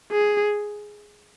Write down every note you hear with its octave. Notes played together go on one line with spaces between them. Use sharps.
G#4